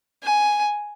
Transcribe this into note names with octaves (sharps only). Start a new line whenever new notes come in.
G#5